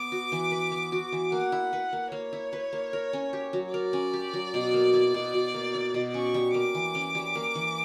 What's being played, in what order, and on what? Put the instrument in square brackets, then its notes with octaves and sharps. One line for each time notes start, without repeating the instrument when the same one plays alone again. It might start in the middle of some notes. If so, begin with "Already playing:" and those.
Already playing: [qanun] B3 [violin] D6
[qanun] F#4
E3
B4
B3
F#4
E3
[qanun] A#3 [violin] F#5
[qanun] E4
B4
A#3
[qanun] A#3 [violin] C#5
[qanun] E4
B4
A#3
A#4
C#4
G4
F#3
[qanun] A#4 [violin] D5
[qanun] C#4
G4
F#3
B2
A#3
E4
B2
B2
A#3
E4
B2
[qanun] C#4 [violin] C#6
[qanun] G3
[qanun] A#3 [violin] D6
[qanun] E3
C#4
G3
A#3
E3